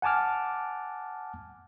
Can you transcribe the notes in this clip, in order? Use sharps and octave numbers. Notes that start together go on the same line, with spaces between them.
F#5 G#5 A5 D6 F6